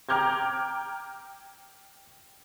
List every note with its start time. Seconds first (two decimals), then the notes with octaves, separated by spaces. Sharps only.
0.09 G5 A#5 D6 F6 G6 G#6